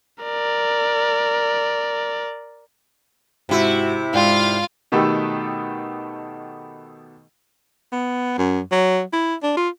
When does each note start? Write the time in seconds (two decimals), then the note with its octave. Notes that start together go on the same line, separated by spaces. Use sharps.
0.24 A#4 D5
3.49 G#2 C3 E4 F#4
4.14 G#2 F4 D5 F5 G5
4.92 B2 D#3 A3 B3 G4 A4
7.92 B3
8.38 F#2
8.72 F#3
9.13 E4
9.43 D4
9.57 F4